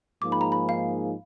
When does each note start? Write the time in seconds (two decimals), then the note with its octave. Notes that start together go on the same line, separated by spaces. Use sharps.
0.22 G#2 F3 A#3 D#4 G#4 D6
0.32 B5
0.41 A#5
0.52 B5
0.69 F5